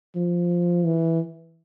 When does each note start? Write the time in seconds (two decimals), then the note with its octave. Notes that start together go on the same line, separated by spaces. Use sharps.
0.15 F3
0.84 E3